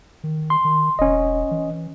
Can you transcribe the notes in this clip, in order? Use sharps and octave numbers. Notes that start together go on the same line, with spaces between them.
D#3
C6
D#3
E1 C#4 D#5
E3